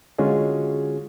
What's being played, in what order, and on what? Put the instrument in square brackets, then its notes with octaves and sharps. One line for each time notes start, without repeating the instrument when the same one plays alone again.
[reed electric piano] D3 G#3 C#4 F4 F#4 G#4